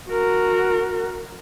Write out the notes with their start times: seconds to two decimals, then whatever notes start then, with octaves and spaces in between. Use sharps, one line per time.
0.10 F#4 A#4